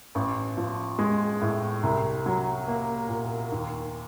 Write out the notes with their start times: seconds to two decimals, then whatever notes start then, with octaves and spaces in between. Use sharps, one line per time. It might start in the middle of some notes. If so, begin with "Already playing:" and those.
0.15 A1
0.57 F3
0.99 G#3
1.41 A2
1.83 C2
2.26 F#3
2.68 A#3
3.09 A#2
3.52 D#2